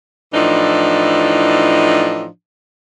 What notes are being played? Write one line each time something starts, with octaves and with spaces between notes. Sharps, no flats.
A2 E3 F3 D4 D#4